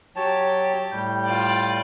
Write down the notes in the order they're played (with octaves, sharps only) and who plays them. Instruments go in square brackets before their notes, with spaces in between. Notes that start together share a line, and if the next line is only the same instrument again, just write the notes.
[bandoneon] F#3 C#5 A5 [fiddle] G4
[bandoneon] A2 G3 G6
[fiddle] F4 D5